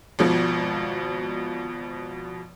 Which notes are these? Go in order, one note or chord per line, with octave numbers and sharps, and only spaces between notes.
G#1 B2 F3